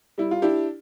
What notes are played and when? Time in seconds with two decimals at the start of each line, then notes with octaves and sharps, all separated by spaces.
0.18 G3 E4
0.31 F4
0.42 D4 E4 G4